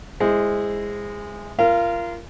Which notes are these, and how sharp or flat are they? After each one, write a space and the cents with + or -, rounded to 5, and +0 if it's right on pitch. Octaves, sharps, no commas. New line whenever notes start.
G#3 -15 E4 +0 C5 +0
F4 -25 A#4 +0 F5 -25